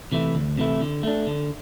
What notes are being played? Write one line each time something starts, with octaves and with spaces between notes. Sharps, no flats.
C3 E3 A3 E4
D2
C3 E3 A3 E4
D3
A3 D4
D3